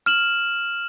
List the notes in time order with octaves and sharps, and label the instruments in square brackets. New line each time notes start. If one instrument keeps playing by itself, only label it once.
[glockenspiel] F6 E7 F#7